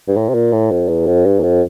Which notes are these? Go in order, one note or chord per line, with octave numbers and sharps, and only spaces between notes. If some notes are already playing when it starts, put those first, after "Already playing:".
G2
A2
C3
A#2
A2
F2
E2
F2
G2
E2
F2